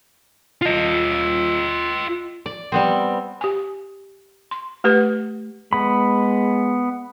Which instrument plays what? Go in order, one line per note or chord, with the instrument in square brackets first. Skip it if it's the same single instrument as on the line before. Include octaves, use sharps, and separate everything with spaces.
[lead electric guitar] F4 D#5
[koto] D5
G3 B3 C4
[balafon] G4 G#5
C6
A3 G4 B4 F#5
[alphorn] G#3 [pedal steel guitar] B3 B5